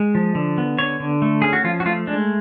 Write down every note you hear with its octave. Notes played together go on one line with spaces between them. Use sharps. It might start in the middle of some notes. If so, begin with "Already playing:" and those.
Already playing: G#3
F3
D3
B3
D3 C#5
D3
A3
C#4 G#4
F#4
F3 F4
F#4
A3 F4
G#3 D4